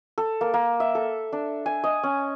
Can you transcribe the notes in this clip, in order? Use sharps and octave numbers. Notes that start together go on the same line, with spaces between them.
A4
A#3
A#3
E5
A4
D4
G#5
D#5
C#4